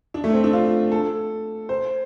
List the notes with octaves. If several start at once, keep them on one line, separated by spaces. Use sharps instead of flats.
D4
A3
C4
D4
F4
A4
C5